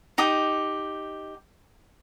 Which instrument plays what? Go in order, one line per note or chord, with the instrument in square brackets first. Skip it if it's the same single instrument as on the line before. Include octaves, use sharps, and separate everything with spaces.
[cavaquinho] D#4 G4 D#6